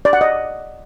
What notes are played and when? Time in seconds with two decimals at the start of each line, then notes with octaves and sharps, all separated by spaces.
0.05 D5
0.13 F#5
0.21 D#5